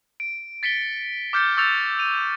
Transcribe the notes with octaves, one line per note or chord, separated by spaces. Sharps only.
D7
A6 B6 C#7 D7 G7
D6 F6 G6 A6 C#7
C#6 E6 G6 A6 C#7 F7
D#7 F7